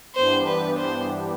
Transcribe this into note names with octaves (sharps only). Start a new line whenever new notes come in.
G2 E3 B3 D4 G4 C5
B4
C5